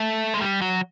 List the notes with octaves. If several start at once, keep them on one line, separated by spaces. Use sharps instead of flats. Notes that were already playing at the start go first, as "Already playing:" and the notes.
Already playing: A3
G#3
G3
F#3